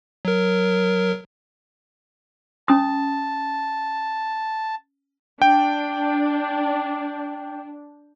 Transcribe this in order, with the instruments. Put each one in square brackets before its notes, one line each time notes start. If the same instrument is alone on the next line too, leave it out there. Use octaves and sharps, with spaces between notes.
[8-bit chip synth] F#3 A#4
[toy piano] C#4 D#6 [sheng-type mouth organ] A5
[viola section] D4 [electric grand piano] G5